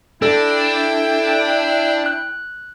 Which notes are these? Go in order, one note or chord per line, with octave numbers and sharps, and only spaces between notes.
D4 E4 A4 G5
F#6